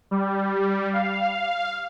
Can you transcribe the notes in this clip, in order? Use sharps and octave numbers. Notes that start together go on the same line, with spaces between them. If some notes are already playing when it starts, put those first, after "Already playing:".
G3
F5